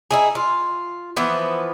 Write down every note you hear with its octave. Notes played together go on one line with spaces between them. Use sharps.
D#4 E4 G#4
F4
E3 F3 B3 E5